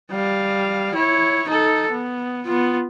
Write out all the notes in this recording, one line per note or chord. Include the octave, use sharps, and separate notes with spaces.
G3 F5
E4 C#5
D#4 A4
B3
B3 F4